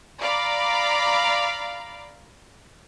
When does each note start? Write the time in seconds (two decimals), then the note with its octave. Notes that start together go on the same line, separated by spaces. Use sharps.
0.21 D5 F5 A#5 B5 D6